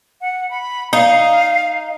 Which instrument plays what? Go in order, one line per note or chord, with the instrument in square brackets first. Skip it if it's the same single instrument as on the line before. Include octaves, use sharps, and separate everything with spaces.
[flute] F#5
B5
[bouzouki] D#4 [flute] F5